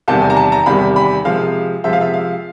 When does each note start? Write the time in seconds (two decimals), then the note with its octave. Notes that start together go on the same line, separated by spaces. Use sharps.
0.08 E2 C3 D#3 G3 A5
0.22 G#5
0.30 A#5
0.37 A5
0.52 A#5
0.66 E2 C3 D#3 G3 B5
0.96 B5
1.25 C3 F3 G#3 F5
1.84 C3 F3 G#3 E5
1.93 F5
2.01 E5
2.14 F5